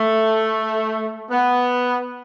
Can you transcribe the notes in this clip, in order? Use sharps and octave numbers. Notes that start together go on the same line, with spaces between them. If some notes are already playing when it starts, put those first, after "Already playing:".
Already playing: A3
B3